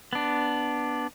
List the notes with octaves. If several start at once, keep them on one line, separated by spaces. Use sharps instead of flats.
B3 D4